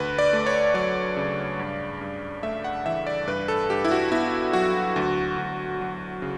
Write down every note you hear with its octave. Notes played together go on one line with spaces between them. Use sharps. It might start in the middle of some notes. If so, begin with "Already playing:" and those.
Already playing: D2 B4
D5
A3
C#5
F#3 D5
C#3
G2
G2
A3 E5
F#5
E3 E5
D5
G2 B4
A4
G2 G4
E4
F#4
B3 E4
F#3 F#4
D2
D2
F#3
C#3